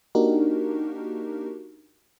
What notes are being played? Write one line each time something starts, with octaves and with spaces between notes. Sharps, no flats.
A#3 D4 D#4 F#4 G4 A#4